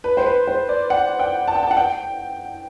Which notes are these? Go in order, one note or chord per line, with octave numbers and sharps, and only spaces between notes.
B4
C5
B4
C5
D5
F#5
G5
A5
G5
A5
F#5
G5